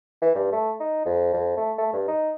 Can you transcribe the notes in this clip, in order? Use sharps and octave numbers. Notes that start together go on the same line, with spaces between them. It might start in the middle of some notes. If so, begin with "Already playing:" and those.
E3
G2
A3
D#4
F2
F2
A3
A3
G2
D#4